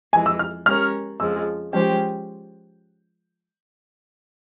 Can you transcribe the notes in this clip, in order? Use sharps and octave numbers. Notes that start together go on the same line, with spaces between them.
F2 E3 G#3 G#5
E6
F6
G#3 C#4 G4 A#4 C#5 F6
F2 C#3 F3 G#3 E6
F3 G#3 C#4 G4 C5 G5